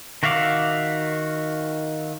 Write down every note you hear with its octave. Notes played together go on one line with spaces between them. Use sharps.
D#3 F#4 E5 F5 D6